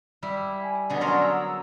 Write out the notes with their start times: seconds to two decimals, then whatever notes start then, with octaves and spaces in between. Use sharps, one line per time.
0.23 G3 E4
0.62 G#5
0.90 B2 D3 G#4
1.01 F#3 C#4 G#4 A#4 D5 C6
1.22 E6